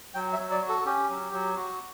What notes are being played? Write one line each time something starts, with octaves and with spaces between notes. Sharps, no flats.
F#3 G5
E5
F#3
D5
F#4
A4
C#4 G4
F#3
F#3
F#4